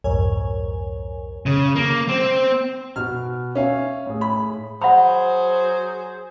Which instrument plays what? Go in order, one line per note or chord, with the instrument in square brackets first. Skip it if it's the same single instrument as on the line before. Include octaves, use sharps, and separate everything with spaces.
[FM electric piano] C2 F2 G#2 A#4 C#5 G#5
[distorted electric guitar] C#3
A#3
C4
[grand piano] B2 [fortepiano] F6
[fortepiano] C#4 [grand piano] E5 F5 G#5
[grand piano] A2 G#4
[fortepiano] B5
[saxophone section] F#3 G#4 C5 [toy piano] F#5 B5